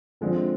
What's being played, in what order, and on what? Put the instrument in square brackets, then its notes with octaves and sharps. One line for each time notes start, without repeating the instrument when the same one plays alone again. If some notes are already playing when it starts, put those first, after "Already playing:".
[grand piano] D3 F3 G#3 C4